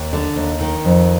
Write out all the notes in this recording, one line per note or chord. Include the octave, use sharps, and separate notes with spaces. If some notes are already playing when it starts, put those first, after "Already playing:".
Already playing: D#2
D3
D#2
D#3
F2